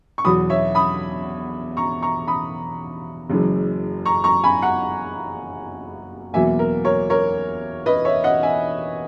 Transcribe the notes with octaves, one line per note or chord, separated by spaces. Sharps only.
C#6
E2 B2 F#3 B5 D#6
C#5 E5
B5 D#6
A#5 C#6
A#5 C#6
B5 D#6
F#1 F#2 E3 G#3
A#5 C#6
A#5 C#6
G#5 B5
F#5 A#5
E2 B2 F#3 A#3 E5 G#5
A#4
A#4 C#5
A#4 C#5
B4 D#5
C#5 E5
D#5 F#5
E5 G#5